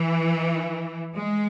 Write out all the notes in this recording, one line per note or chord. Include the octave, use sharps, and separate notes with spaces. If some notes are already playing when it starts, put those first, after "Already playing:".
Already playing: E3
G#3